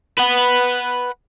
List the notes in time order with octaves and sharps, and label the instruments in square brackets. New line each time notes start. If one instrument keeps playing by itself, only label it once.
[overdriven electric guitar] B4 F#5